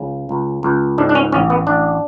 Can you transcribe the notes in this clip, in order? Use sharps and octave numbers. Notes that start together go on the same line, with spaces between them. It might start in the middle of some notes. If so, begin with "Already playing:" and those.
Already playing: C#2 C#3
C#2
C#2
G#2 D4
D4
C#4
A1 C#4
B3
A1 D4